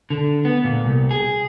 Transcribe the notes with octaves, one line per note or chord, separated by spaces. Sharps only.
D3
B3
A#2
C2
G#4